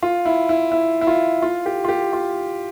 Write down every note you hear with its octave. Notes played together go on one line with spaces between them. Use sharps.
F4
E4
E4
E4
E4
F4
F4
G4
F4
G4
F4